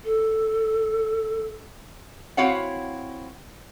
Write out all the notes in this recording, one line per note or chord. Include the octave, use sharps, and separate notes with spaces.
A4
C4 E4 F#4 C#5 F5 F#5